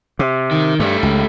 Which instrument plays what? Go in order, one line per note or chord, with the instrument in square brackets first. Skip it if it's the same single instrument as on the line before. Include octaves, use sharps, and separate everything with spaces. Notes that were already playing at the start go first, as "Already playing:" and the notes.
[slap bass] C3
[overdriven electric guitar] D#3
[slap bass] G2 [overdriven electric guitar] A3 G4
[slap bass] C#2